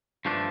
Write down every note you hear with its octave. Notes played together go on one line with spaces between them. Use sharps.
G2 F3 A3 D4